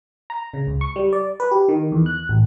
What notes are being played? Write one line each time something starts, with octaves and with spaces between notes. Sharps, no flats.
A#5
C#3
C#2
C#6
G3
D5
B4
G4
D#3
E2
F#6
A1